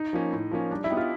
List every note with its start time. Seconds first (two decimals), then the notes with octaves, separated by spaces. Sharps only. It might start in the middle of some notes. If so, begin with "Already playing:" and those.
Already playing: D#4
0.13 F3 A#3 C#4
0.33 A2
0.51 F3 A#3 C#4
0.71 G3 D4
0.84 E4
0.90 B3 D#4 G4
0.97 F4